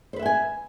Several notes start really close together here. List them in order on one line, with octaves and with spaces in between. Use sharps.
C5 B4 E5 G5 G#5